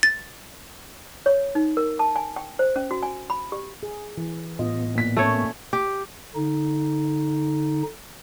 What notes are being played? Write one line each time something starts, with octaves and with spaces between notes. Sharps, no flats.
A6
C#5
D#4
A#4
A5
G#5
G5
C5
C#4
F#4
G#5
B5
G4
G#4
E3
A2 B3 F4 D#5
A#2 B6
A3 A#3 C#4 C#5
G4
D3 D#4